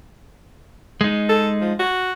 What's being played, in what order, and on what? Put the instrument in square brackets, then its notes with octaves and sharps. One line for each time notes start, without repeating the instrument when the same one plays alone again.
[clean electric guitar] G#3 D#4
[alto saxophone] A4
F3
F#4